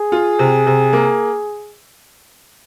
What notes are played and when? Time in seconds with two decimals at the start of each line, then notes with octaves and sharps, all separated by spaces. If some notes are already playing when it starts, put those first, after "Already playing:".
Already playing: G#4
0.12 F4
0.39 C3
0.67 C3
0.93 A#3